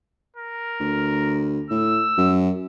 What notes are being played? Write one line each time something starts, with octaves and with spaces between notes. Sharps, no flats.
A#4
D2
A2 E6
F#2